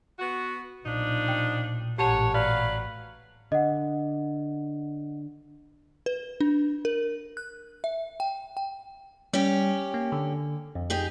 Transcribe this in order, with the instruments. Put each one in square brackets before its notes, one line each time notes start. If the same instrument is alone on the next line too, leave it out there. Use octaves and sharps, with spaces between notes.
[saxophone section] B3 F#4
[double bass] B1 [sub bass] A#2 [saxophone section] F3 D4 D#4
[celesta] G5
[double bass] A1 [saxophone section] F#2 C#5 F#5 [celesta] G4 A5 F7
[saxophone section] F#3 B4 F5 [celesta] D5
[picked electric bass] D3 [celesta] D#5 F#5
[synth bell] B4
D4
A#4
F#6
E5
G5
G5
[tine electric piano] G3 [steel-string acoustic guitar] C#4 G4
[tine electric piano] A#3
D3
F2
[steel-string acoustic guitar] D#4 G4 G#4